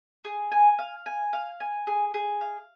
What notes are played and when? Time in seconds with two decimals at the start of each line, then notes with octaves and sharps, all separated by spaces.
0.25 G#4
0.52 G#5
0.79 F5
1.06 G#5
1.33 F5
1.60 G#5
1.87 G#4
2.14 G#4
2.41 F5